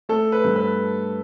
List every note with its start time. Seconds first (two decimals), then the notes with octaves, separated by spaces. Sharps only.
0.09 A3 A4
0.32 B4
0.44 G2
0.56 B4